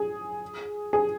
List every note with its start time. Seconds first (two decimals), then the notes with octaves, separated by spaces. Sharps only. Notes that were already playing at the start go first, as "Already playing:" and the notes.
Already playing: G#4
0.93 G#4